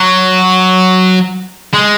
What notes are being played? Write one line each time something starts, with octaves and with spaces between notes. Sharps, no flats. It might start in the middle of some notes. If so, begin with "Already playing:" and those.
Already playing: F#3
G#3